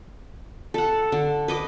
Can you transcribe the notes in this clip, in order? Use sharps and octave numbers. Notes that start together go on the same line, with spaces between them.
A4 F#5
D3
B4 D#5 D6